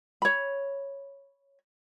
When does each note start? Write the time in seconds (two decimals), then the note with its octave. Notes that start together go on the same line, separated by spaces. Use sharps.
0.22 C#5 B5